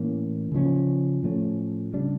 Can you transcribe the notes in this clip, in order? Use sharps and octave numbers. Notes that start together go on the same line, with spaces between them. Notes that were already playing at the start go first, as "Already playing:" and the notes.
Already playing: A2 E3 A#3 C#4
C#3 F3 C#4
A2 F3 A3 C#4
C#3 G3 D4